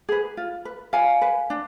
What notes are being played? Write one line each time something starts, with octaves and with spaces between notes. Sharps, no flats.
G#4 B4
F4
B4
F4 F5 G#5
B4
D4